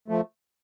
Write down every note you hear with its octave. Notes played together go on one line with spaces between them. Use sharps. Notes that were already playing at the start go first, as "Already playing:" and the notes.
F3 A3